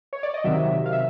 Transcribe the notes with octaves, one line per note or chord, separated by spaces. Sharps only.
C#5
D5
D#5
C3 D#3 F#3 E5
F5
E5